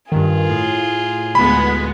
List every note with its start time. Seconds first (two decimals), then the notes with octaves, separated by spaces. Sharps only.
0.12 G2 D#3 F4 G#4
0.49 A2
1.35 D2 G#3 B3 B5